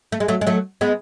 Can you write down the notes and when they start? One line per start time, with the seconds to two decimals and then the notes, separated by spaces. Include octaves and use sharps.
0.12 A3
0.20 G#3
0.28 F#3 A3
0.41 G#3
0.47 F#3 A3
0.81 G#3 B3